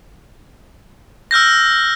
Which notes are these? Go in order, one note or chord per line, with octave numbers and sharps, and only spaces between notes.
E6 F6 G6 A#6